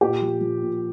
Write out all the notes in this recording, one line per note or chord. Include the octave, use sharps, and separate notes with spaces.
A#2 G4
F3
F3
A#2